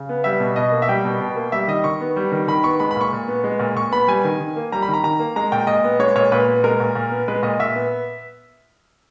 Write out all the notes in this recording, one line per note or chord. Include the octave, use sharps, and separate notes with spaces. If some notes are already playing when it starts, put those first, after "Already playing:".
Already playing: C#3
B3
G3 E5
B2
B2 D#5
A#3
E5
G3 G5
B2
B2
A#3
G3 E5
D#3 D#5
D#3 C#6
B3
G3
D#3
D#3 B5
B3 C#6
G#3 B5
B5
A#2 C#6
A#2
B3
G#3
A#2
A#2 C#6
B3 B5
G3 G#5
D#3
D#3
A#3
G3 A#5
B5
D#3
A#5
D#3 A#5
A#3
G#3 A#5
A#2 G5
A#2 D#5
B3
G#3 C#5
A#2 C#5
A#2 B4
B3
G#3 A#4
A#2
A#2
B3
G#3 B4
A#2 D#5
A#2 E5
B3